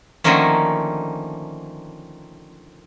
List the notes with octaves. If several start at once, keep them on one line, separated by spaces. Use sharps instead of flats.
D3 D#3 F3 A3 A#3 C#4